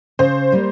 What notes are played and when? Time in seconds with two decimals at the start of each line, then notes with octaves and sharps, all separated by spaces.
0.19 C#3 C5
0.52 G3 A#3